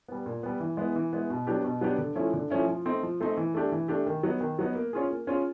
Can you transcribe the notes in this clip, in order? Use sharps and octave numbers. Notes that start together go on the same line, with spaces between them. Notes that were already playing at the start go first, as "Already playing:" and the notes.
G3 B3
A#2
G3 B3
E3
G#3 B3 E4
E3
G#3 B3 E4
B2
F#3 B3 D4 G4
B2
F#3 B3 D4 G4
D3
F3 A3 C#4 E4
D3
F3 A3 C#4 E4
F3
A3 C4 D#4
F3
A3 C4 D#4
E3
A3 D4 G4
E3
A3 D4 G4
D#3
F#3 B3 D#4
D#3
F#3 B3 D#4
A#3
C#4 F4 G#4
A#3
C#4 F4 G#4